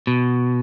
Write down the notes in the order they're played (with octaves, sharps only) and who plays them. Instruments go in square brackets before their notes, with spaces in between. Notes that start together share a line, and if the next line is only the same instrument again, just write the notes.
[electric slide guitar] B2